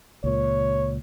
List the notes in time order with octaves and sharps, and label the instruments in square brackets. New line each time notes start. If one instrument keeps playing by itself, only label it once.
[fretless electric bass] C#2 A#2 [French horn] C#5